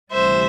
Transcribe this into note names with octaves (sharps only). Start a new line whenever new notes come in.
D2 C3 E3 G3 C5 E5